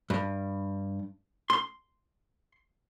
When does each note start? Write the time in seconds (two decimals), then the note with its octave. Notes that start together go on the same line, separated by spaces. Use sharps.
0.10 G2
1.50 C6